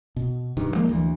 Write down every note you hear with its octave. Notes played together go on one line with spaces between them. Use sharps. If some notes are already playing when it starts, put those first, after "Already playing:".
B2
G2 D#3
F3 G#3 A#3
D2 E3